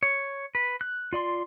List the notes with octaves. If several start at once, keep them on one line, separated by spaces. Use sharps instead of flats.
C#5
B4
F#6
F4 D5 C6